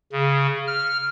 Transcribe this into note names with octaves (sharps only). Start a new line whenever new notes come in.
C#3
F6